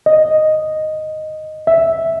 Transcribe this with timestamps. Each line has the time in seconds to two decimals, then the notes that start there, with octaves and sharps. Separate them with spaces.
0.06 D#5
1.67 E5